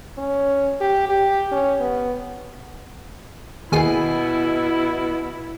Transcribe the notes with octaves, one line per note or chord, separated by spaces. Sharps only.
C#4
G4
G4
C#4
B3
D#2 B2 E4 G#4 C7